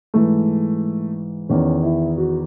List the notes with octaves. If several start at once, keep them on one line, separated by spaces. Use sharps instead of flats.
G#2 E3 A3
E2 D#3 C#4
E4
F#4